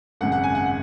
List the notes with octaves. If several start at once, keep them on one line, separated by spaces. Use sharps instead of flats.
G#1 F#2 C#3 F#5
F#5
G#5
F#5
F#5